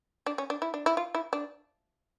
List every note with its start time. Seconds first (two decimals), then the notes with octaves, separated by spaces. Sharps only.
0.26 D4
0.38 C#4
0.50 D4
0.62 E4
0.74 D4
0.86 E4
0.97 F4
1.15 E4
1.33 D4